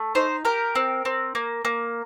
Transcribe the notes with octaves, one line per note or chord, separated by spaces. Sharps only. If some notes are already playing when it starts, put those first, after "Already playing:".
Already playing: A3
D#4 C5
G4 A#4
C4
C4
A#3
A#3